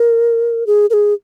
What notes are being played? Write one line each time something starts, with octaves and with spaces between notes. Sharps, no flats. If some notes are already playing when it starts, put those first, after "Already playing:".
Already playing: A#4
G#4
A#4
G#4